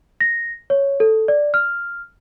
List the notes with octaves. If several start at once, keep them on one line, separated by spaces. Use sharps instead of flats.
A#6
C#5
A4
D5
F6